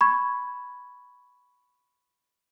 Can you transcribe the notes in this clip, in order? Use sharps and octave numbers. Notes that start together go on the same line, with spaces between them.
B5 C#6 G#6